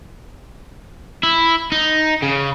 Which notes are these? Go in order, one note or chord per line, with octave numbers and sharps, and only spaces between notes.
E4
D#4
C#3